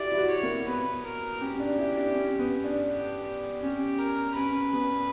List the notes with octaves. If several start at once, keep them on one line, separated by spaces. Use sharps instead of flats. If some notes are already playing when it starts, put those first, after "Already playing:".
Already playing: E4 F#4 G4 D5
E4
F#4
C#5
A#3
B3 B4
A#4
C#4 G4
D4
E4
D4
C#4
B3
D4
G4
C#4 G4
A#4
C#4 B4
B3